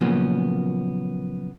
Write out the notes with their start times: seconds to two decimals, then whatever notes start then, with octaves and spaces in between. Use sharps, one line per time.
0.01 A#2 C#3 F3 F#3 A#3 B3